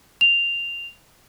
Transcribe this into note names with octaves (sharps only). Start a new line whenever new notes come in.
F7